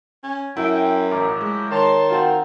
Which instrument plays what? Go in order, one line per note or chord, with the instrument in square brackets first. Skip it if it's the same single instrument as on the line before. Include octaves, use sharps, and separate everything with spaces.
[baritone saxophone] C#4
[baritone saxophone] F#2 [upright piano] E4 [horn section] G5
[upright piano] A1 A#4 [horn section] F3 F#3 E4 [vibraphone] D6
[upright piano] G#3
[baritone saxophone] D#3 [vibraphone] C#5 [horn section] A5 C6
[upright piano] C4 F4 [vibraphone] F#4 F#5